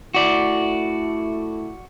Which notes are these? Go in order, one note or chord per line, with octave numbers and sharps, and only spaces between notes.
A3 E4 F#4 D5